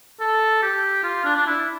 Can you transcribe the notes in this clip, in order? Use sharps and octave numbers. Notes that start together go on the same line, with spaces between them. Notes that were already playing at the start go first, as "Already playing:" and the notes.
A4
G4
F4
D4
D4
E4